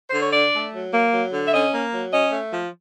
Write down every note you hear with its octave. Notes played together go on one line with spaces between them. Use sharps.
D3 C5
C#5
D4 D5
A3
F#3
A#3
F#3
D3
E5
C#4 D#5
A#3
F#3
C#4 D#5
A3
F3